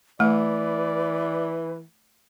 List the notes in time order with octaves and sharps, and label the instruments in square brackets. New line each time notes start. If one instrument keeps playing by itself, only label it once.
[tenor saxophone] E3 [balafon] A3 [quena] B4 [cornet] D5